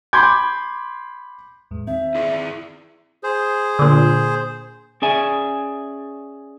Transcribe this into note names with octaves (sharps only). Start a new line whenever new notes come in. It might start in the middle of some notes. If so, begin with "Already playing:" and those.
B5 C6 D6 G6 G#6
E2 A2 G#3
D#3 C4 E5
E4 G#4 D5
G#4 C5
A#2 D3
C#4 G#4 D5 E5 G#5